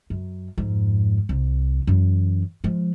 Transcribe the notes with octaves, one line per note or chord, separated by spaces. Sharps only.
F#2
F2 G#2
C2
F#2 E3
F3 G#3